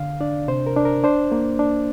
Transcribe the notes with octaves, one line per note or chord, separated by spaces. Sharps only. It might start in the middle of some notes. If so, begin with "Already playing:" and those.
Already playing: D3 F5
D4 D5
C3 C5
A#4
D4
A#4
D4 C5
A#3
D4